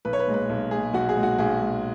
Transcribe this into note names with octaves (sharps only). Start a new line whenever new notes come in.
B1 B4
C#5
B4
A#2 G#3
B4
B1
A#2 G#3 G#4
B1 F#4
G#4
A#2 G#3
F#4
B1 G#4
A#2 G#3